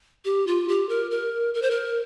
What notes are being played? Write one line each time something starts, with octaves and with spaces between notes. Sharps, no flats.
G4
F4
G4
A#4
A#4
A#4
C5
A#4